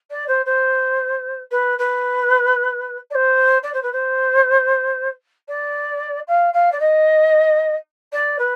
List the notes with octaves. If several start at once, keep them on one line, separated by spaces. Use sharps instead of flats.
D5
C5
C5
B4
B4
D5
C5
D5
C5
B4
C5
D5
F5
F5
D5
D#5
D5
B4